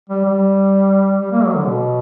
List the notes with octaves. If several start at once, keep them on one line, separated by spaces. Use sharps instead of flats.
G3
G3
G3
A#3
F#3
D3
B2